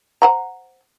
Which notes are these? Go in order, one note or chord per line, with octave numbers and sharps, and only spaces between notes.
C5 F#5 A#5